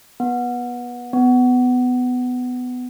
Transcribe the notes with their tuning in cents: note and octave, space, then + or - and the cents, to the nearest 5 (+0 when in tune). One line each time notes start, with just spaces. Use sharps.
B3 -20
B3 +15